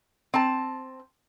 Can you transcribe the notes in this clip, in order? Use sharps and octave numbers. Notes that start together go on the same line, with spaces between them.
C4 A5